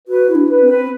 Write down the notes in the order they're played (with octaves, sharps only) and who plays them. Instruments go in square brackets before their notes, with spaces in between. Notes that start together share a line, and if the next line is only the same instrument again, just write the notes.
[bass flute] F#4 [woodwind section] B4
[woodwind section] E4
[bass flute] D4
[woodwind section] B4
[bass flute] C4
[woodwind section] B4